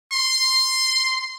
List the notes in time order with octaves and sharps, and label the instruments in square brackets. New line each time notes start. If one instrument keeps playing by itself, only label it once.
[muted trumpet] C6